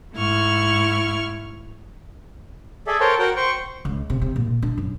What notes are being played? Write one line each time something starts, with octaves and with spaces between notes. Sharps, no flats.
G#2 A3 E4 C#6 F6
G#4 A4 D5 E5
A4 A#4 C5 C#5 G5 A5
F#4 A#4 F#5 G5
C5 G5 C#6
C#2
C3
C3
A#2
D4
F#2